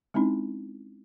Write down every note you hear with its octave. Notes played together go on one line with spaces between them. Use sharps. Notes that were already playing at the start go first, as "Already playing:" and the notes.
G#3 C4 C#4 D#4 E4